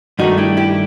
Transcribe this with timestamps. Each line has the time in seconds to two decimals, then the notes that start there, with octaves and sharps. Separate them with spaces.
0.19 G2 D#3 A3 D#4 F#4
0.38 E4 G4
0.57 E4 G4